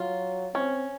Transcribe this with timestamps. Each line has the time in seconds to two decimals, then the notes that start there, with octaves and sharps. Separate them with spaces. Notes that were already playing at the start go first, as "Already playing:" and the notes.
Already playing: F#3 F4
0.55 C4 C#4